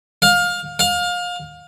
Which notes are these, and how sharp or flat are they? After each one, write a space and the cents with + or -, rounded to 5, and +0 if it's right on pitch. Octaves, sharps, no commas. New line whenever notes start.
F5 +20
F5 +25